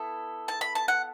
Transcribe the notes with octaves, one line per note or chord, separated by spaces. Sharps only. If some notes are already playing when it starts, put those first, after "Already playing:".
Already playing: B3 E4 A4
A5
B5
A5
F#5